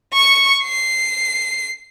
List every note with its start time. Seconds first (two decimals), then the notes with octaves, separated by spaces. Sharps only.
0.13 C#6 C#7
0.63 C7